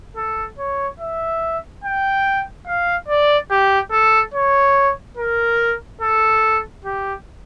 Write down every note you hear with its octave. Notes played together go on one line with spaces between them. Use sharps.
A4
C#5
E5
G5
F5
D5
G4
A4
C#5
A#4
A4
G4